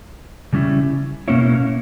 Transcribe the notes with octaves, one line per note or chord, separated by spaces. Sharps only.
C#3 G3 C#4 E4
B2 A#3 C#4 E4 C#5